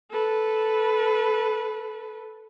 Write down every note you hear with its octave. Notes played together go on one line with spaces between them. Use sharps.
A4 B4